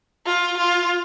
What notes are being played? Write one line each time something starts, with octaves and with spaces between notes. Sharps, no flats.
F4
F4